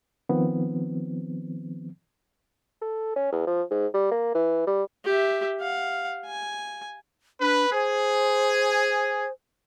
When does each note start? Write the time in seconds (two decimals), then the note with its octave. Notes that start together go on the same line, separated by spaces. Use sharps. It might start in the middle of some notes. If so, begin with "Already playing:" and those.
0.29 D#3 F3 B3 C4
2.82 A4
3.16 C#4
3.32 E2
3.47 F3
3.71 G#2
3.94 G3
4.12 A#3
4.35 E3
4.67 G3
5.05 G4 E5
5.60 F5 F#5
6.26 G#5
7.41 D4 B4
7.72 G#4 C5